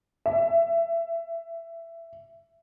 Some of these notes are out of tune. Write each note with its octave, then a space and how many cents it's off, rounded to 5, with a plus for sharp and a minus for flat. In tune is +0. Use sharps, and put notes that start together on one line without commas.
E5 +15